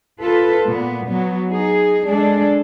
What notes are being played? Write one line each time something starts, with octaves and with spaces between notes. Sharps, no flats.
F4 A4 B4
A#2 B3
F#3 B3
D#4 G#4
G#3 D4 G#4 A4